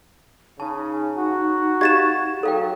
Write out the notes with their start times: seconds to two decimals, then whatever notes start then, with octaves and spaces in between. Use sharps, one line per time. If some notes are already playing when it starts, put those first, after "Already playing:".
0.60 C#3 D#4 A5
1.18 F#4
1.81 G4 D#5 F5 G#6 A6 E7
2.43 F#3 A4 F5 G5